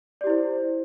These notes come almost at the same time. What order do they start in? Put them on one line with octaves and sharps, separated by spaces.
D5 G4 E4 C5